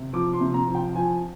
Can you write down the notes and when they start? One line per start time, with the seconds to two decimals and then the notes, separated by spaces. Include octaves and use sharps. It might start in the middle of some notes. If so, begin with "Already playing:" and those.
Already playing: C3
0.13 F3 D6
0.33 C6
0.41 C3
0.54 A#5
0.68 F3
0.75 G5
0.95 F3 G#5